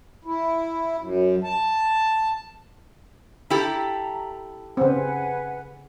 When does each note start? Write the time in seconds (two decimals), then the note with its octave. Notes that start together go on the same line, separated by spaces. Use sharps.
0.25 E4
0.99 F#2
1.44 A5
3.50 E4 G4 A4 A#5
4.77 C#3 C4 B4 F#5 G#5